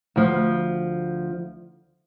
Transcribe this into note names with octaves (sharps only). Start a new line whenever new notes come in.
D2 F3